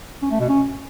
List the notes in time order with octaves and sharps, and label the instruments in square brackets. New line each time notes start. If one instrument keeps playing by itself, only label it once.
[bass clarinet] C#4
A3
B2
C#4